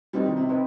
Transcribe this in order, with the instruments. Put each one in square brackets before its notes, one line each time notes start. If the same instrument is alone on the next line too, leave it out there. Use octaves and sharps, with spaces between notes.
[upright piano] G3 [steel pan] C4 D#4 B4
[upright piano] D#3
C3
[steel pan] C4 D#4 B4